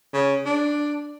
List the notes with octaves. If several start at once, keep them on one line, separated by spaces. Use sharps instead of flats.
C#3
D4